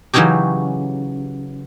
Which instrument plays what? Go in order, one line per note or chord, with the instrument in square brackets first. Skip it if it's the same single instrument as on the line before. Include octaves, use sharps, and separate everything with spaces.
[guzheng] C#3 E3 F#3 C#4 D#4 G4